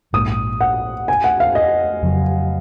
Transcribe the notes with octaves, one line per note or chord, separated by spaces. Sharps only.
A#1 G#2 D#3 A#3 D#6
F#5
G#5
F#5
F5
D#5
F2 C#3 F#3